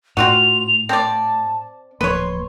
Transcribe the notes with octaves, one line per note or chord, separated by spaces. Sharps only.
A2 C4 F4 F#4 F7
C4 D5 A5
D1 F3 A#3 B4 C#5 C6